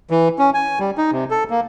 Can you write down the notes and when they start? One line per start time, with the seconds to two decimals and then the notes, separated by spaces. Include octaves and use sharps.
0.11 E3
0.39 C#4
0.54 G#5
0.80 G3
0.98 D#4
1.12 C3
1.31 A4
1.50 A#3